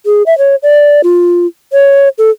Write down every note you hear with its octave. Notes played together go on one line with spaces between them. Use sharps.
G#4
E5
C#5
D5
F4
C#5
A4